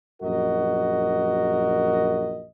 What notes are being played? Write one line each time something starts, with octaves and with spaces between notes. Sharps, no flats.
A#1 F#2 F#4 A#4 D#5